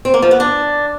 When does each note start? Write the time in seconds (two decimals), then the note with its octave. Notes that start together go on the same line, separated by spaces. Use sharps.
0.05 C4
0.14 A#3
0.22 F3
0.31 B3
0.40 D4